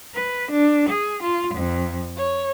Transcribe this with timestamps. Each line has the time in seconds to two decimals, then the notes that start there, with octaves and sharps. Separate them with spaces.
0.15 B4
0.52 D4
0.90 G#4
1.23 F4
1.55 F2
2.17 C#5